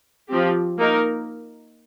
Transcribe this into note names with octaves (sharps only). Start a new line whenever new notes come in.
F3 C4 G4
A#3 D#4 A#4